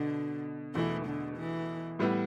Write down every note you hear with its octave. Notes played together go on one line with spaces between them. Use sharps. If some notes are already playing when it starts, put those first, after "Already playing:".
Already playing: B2 D3
E2 B2 E3 A3 E4
D3
E3
A2 G3 B3 E4